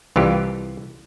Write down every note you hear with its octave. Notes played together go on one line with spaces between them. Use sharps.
C2 E3 F4 G4